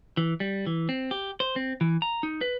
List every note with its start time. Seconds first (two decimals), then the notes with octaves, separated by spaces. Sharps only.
0.17 E3
0.40 G3
0.67 E3
0.89 C4
1.11 G4
1.40 C5
1.56 C4
1.81 E3
2.02 A#5
2.23 D#4
2.41 B4